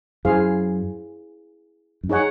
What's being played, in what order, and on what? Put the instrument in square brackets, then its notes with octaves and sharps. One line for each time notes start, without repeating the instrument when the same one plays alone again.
[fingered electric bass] F#2 [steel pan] E4 G#4 C5 F5
[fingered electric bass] F#2
[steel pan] D#4 G#4 C#5 F#5